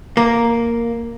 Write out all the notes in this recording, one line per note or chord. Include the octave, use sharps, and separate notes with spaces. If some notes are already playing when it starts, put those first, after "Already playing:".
A#3